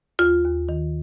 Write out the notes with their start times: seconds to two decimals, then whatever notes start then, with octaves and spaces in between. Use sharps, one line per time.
0.19 D#2 F4
0.44 D#2
0.69 D#3